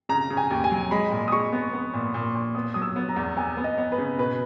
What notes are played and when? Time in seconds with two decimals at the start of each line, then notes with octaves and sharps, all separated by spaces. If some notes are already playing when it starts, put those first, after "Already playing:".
0.09 C#3 A#5
0.30 C#3
0.37 G#5
0.51 D#2
0.64 G#5
0.71 F#3
0.91 G#3 B5
1.12 A#2
1.28 D#6
1.32 G#3 C#6
1.52 B3
1.73 B3
1.94 A#2
2.14 A#2
2.35 A#2
2.55 B3 D#6
2.74 F#3 D#6
2.82 E6
2.96 B3
3.09 A#5
3.16 E2
3.37 B3 G#5
3.57 B3
3.64 D#5
3.78 B3
3.92 B4
3.98 C#3
4.18 B2 B4